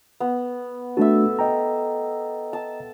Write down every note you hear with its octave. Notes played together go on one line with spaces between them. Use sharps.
B3
A3 D4 F#4 A4 E5
D#5 G5 A#5
A5